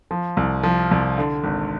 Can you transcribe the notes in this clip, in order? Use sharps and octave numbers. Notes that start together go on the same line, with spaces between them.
F3
C2
F3
C2
D3
G#1